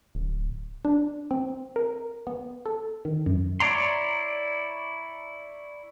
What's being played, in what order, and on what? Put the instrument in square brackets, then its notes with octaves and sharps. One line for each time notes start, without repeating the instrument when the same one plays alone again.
[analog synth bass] D1
[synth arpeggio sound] D4
C4
A#4
B3
A4
D#3
F#2
[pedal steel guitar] E4 C#5 D5 A#5 C6